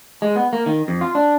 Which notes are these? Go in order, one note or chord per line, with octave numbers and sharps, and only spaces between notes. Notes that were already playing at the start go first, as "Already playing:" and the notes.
G#3
B3
A#3
D#3
F2
F4
D4